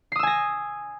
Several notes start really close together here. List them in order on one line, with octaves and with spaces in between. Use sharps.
C7 D#6 E6 G#5 A#6